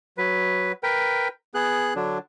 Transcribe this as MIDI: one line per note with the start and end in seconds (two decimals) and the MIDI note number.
0.18 0.72 54
0.18 0.72 71
0.83 1.28 70
0.83 1.28 71
0.83 1.28 79
1.54 1.94 59
1.54 1.94 68
1.54 1.94 90
1.96 2.18 50
1.96 2.18 54
1.96 2.18 62